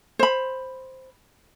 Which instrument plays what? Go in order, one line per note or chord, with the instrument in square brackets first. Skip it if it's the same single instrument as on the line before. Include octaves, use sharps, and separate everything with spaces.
[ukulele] C5 B5